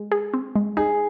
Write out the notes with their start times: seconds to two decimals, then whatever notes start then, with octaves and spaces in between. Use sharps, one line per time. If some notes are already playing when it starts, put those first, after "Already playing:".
Already playing: G#3
0.12 G#4
0.34 C4
0.56 G#3
0.77 D#4 G#4